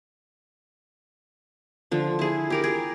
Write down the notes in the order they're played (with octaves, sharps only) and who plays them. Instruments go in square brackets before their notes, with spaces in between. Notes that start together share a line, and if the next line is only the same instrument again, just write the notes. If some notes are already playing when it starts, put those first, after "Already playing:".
[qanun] D3 F3
E4 G#4
G4 A#4 D5
G#4